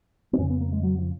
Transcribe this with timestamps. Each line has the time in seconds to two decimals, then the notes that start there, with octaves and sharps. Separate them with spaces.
0.33 B3
0.38 F2 C#4
0.41 C#3
0.50 B3
0.61 A#3
0.72 G#3
0.83 F#3
0.98 F3